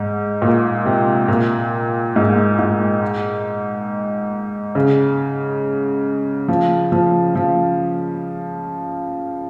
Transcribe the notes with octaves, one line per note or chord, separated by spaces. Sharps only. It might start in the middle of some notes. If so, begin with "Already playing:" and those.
Already playing: G#2
A#2
C3
A#2
G#2
G#2
C#3
F3
F3
F3